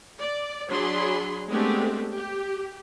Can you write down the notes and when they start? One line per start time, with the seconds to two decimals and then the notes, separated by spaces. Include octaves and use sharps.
0.20 D5
0.69 F#3 D4 G#4 B5 C6
1.48 G#3 A3 B3 C4 D4 G4
2.14 G4